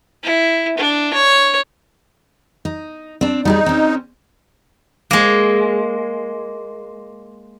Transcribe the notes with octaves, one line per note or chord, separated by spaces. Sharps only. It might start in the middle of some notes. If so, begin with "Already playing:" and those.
E4
D4
C#5
D#4
C4 D4
G3 D#4 G4 G#4
C4 C#4
G#3 A#3